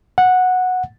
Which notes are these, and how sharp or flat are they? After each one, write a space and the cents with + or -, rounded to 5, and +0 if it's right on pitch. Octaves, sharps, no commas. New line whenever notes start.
F#5 -10